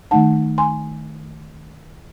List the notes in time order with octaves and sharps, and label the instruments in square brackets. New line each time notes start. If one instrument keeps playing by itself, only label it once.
[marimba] D#3 A3 D#4 F#5 A5
G#5 C6